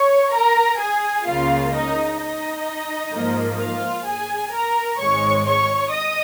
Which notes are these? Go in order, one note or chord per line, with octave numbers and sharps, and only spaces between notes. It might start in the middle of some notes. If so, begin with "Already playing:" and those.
Already playing: C#5 C#6
A#4 A#5
G#4 G#5
C#2 C#3 A#3 F4 F5
D#4 D#5
D#4 D#5
G#2 F3 A#3
F4 F5
G#4 G#5
A#4 A#5
G#1 G#2 G#3 C#5 C#6
C#5 C#6
D#5 D#6